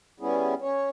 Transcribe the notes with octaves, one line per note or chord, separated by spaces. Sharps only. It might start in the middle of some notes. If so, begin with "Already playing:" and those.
G3 B3 C#4 E4 G#4
C#4 C#5